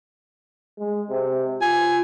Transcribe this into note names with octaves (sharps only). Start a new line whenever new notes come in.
G#3
C3
F4 G#5